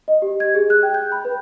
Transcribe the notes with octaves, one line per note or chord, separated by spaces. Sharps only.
D#5
G4
G#6
G#4
F#6
G5
G6
B5
B4